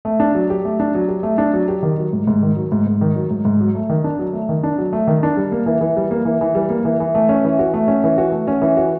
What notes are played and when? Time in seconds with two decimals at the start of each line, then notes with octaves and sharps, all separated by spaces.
0.05 A3
0.20 D4
0.35 F#3
0.50 G4
0.65 A3
0.80 D4
0.95 F#3
1.08 G4
1.23 A3
1.38 D4
1.54 F#3
1.68 G4
1.83 D#3
1.98 F#3
2.13 G#2
2.27 G#2
2.42 D#3
2.56 F#3
2.72 G#2
2.86 G#2
3.01 D#3
3.16 F#3
3.31 G#2
3.45 G#2
3.61 F#3
3.75 A3
3.89 D#3
4.04 D4
4.19 F#3
4.33 A3
4.49 D#3
4.64 D4
4.78 F#3
4.93 A3
5.07 D#3
5.23 D4
5.37 G3
5.52 A#3
5.66 E3
5.81 E3
5.97 G3
6.11 A#3
6.25 E3
6.41 E3
6.55 G3
6.70 A#3
6.85 E3
7.00 E3
7.15 A3
7.29 C#4
7.45 E3
7.59 F#4
7.74 A3
7.88 C#4
8.04 E3
8.18 F#4
8.32 A3
8.48 C#4
8.62 E3
8.77 F#4